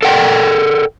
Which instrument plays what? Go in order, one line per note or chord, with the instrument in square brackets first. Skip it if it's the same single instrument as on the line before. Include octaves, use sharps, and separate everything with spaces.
[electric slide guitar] A4 A#4 D5 F#5 G5